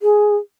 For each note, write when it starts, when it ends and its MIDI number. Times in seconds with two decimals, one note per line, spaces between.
0.02 0.36 68